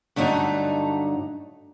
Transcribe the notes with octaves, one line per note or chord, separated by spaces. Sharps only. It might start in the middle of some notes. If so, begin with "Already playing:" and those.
G2 D3 F#3 A3 C4 D#4